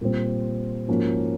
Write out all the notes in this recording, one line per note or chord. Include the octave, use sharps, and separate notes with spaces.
A#2 G3 C4
G#2 F3 A#3 C#4 F#4